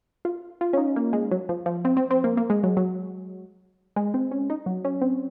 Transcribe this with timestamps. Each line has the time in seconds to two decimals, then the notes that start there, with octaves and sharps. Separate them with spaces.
0.25 F4
0.61 F4
0.73 C#4
0.77 D#4
0.96 A#3
1.13 G#3
1.31 F#3
1.49 F3
1.66 F3
1.85 C4
1.97 C4
2.11 C4
2.24 A#3
2.37 A#3
2.50 G#3
2.63 F#3
2.77 F#3
3.96 G#3
4.14 C4
4.31 C#4
4.50 D#4
4.66 F#3
4.85 C#4
5.02 C4